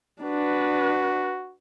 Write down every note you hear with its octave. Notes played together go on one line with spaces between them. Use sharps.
D4 F#4 B4